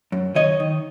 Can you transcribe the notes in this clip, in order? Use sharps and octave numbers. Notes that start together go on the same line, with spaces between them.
F#2
D#3 C#5 D#5
D#3